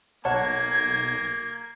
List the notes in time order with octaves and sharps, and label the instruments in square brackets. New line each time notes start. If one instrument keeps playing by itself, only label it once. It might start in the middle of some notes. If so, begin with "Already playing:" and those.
[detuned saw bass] B1 [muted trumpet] A#3 [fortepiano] C#5 F#5 A5 [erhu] G#6